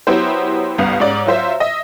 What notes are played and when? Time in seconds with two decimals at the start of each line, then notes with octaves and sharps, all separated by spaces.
0.07 F#3 B3 E4 G4 C5
0.78 G1 C2 B3 F5
1.00 G#2 C#4 D5
1.26 F#3 F4 C5 E5
1.60 D#5 E5